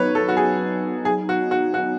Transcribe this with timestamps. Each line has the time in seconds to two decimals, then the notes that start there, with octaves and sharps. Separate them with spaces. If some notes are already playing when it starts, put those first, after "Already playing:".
Already playing: F#3 B3 D#4 B4 C#5
0.15 A4
0.28 F#4
0.37 G#4
1.05 G#4
1.29 F#4
1.51 F#4
1.74 F#4